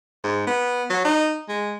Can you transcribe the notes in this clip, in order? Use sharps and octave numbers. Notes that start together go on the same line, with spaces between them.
G#2
B3
F#3
D#4
G#3